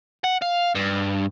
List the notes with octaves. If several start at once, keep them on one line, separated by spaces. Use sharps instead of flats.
F#5
F5
G2